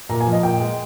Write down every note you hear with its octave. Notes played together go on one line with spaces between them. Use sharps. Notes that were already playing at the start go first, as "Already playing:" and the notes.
A#2 A#5
G#5
F3
D#5
A#2 G5
G#3